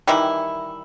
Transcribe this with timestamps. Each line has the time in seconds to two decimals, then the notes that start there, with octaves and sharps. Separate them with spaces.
0.07 D#3 E3 G3 E4